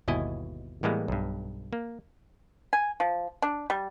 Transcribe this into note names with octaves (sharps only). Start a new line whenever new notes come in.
G1 D#2 B2 E4 D#5 G#5
A2 E3 G3 G#3 A#3 B3
B1 G2
A#3
G#5
F3
D4
G3